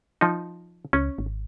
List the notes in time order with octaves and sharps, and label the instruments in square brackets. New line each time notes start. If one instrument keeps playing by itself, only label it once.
[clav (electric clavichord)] F3 D#4
[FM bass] C#2 [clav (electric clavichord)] C#4
[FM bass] G#1